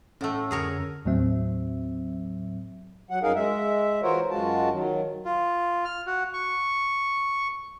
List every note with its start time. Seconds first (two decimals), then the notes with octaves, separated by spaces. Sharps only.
0.21 A2 A3 C#4 F#5 E6
0.51 F2 D3 G#4 A#4 C#5
1.05 D#2 A2 F#3 C4 E5
3.10 F#3 F#5
3.23 F#2 D#4 G#4 A#4 F5
3.36 G#3 E5
4.02 E3 F4 F#4 A#4 C5 C#5
4.30 F#2 G#3 F4 F#4 A5
4.72 D#3 F#3
5.25 F4
5.85 F6
6.07 F#4
6.33 C#6